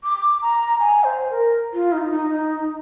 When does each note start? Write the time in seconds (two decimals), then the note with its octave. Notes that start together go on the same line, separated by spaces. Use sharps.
0.04 D6
0.42 A#5
0.80 G#5
1.04 C5
1.30 A#4
1.73 F4
1.92 D#4
2.11 D#4
2.30 D#4